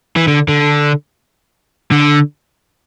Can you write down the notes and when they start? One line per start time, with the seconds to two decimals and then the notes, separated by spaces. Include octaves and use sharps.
0.16 E3
0.27 D3
0.49 D3
1.92 D3